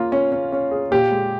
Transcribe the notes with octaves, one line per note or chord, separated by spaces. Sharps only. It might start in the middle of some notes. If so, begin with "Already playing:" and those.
Already playing: A#3 C#4 F4
C#4
C#4
C#4
G#4
A#2 G4
G#3